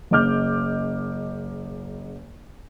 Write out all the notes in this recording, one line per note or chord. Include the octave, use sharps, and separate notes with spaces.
F#1 C#3 D#5 D6 F6 G6